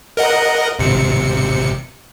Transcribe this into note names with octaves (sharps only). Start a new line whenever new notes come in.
A#4 D#5 F#5
G#1 C3 C#7